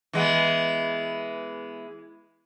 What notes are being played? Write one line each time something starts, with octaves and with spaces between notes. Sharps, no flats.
E3 G#3 B3